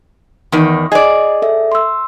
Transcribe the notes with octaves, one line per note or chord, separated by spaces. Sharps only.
E2 D#3
G#4 D5 D#5
A4 E5
C6 E6